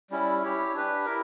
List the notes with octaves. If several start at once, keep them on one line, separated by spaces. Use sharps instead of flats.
G3 C#4 E4
E4 G4 C#5
D4 G4 B4
E4 A#4